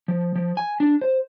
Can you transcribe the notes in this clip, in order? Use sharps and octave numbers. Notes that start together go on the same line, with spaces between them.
F3
F3
G#5
D4
C5